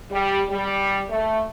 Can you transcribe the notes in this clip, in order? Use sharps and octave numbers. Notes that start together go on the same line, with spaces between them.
G3
G3
A3